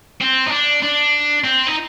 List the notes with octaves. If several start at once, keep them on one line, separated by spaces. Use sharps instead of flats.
C4
D#4
D4
D4
C4
D#4